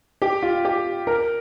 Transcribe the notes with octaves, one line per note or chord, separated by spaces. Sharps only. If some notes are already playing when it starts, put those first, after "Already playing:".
G4
F4
G4
A#4